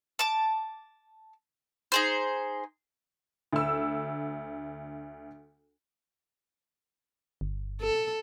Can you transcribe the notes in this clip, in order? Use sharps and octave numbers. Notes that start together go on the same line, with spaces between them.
A5 D6
D#4 G#4 C5
D2 E6
G1
A4